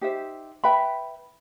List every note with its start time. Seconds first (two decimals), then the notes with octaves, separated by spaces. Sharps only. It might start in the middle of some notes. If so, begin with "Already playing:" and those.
0.01 D#4 G4 C5 E5
0.64 B4 E5 G5 B5